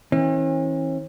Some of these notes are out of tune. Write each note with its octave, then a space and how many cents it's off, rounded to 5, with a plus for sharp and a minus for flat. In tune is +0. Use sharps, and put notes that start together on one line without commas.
E3 -40 C#4 -45